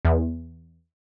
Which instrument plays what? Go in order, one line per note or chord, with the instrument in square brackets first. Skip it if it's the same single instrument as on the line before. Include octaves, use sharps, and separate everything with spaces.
[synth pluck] E2